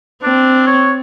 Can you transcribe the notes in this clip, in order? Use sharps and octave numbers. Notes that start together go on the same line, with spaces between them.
C4 D4
C#5